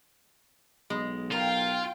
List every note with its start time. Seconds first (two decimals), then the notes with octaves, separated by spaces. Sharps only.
0.90 B1 G#3
1.32 F4 A#4 F5 G5